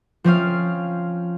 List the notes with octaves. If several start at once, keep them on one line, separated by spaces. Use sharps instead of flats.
F3 C4 C#4 F5